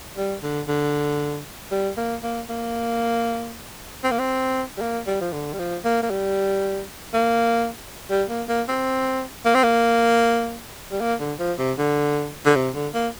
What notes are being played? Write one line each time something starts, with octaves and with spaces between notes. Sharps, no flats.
G3
D3
D3
G3
A#3
A#3
A#3
C4
A#3
C4
G3
A#3
G3
F3
D3
G3
F3
A#3
A#3
G3
A#3
G3
A#3
A#3
C4
A#3
C4
A#3
G3
A#3
D3
F3
C3
D3
D3
C3
D3
A#3